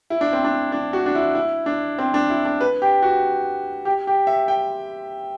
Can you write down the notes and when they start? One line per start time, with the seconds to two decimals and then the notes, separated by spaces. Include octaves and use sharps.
0.10 E4
0.21 D4
0.33 C4
0.45 D4
0.72 D4
0.93 F#4
1.06 D4
1.15 E4
1.35 E4
1.66 D4
1.99 C4
2.14 D4
2.30 E4
2.45 D4
2.61 B4
2.82 G4
3.02 F#4
3.85 G4
4.07 G4
4.27 E5
4.48 G5